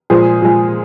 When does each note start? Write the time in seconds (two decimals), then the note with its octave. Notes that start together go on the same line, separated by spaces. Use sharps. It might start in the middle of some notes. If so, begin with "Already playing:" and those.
0.10 A#2 F3 G#3 G#4 C5
0.42 A#2 F3 G#3